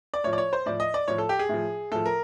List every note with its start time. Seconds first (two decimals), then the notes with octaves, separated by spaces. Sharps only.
0.14 D5
0.24 A2 F3 C#5
0.33 D5
0.38 C#5
0.53 C5
0.66 A2 F3 D5
0.80 D#5
0.94 D5
1.08 A2 F3 C#5
1.18 A4
1.29 G4
1.39 G#4
1.49 A2 F3
1.92 A2 F3 A4
2.06 A#4